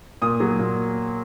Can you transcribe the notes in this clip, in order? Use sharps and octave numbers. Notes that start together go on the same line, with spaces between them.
A#2 D#6
F#3
A#2